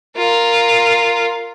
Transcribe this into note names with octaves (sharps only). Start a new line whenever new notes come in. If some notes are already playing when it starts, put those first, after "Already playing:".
F4 A#4